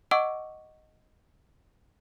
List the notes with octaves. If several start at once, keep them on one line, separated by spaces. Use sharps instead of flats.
D#5 F#5 C#6 D6 E6 D7